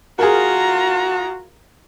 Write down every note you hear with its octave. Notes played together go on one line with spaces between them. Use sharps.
F4 F#4 G#4 A#4 A#5